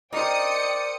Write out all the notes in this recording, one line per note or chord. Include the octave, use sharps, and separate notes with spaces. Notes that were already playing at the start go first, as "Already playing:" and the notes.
D#4 A#4 C5 D5 G5 D#6 C#7